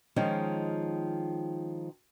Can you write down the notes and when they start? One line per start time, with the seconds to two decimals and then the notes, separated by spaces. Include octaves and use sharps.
0.16 D#3 F3 G#3 C#4